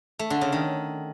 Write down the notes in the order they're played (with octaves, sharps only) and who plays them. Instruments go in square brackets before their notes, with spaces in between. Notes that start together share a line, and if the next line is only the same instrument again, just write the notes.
[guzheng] A3
D3
C#3
D#3